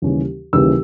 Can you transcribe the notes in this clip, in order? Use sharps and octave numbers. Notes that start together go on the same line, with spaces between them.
D#2 C#3 E3 G3 C#4
D#2 C#3 E3 G3 C#4 E6